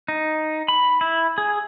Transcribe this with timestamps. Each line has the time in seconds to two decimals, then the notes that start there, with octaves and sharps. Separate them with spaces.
0.08 D#4
0.68 B5
1.01 E4
1.38 G#4